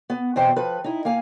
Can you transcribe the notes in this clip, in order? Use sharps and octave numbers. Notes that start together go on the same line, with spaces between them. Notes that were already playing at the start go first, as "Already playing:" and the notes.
B3
E2 B2 C4 C5 G5
F3 B4
D#4 E4
A#3 F5 G#5